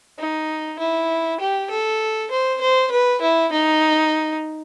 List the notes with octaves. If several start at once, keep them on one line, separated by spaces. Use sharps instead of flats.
D#4
E4
G4
A4
C5
C5
B4
E4
D#4